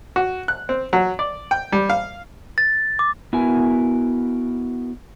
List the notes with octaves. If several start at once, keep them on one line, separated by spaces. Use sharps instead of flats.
F#4
F#6
C4
F#3
D5
G5
G3
F5
A6
D6
B3 E4 F#4 A#4 G#5